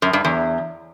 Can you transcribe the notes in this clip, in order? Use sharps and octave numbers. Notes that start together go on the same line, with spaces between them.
F#2
G2
E2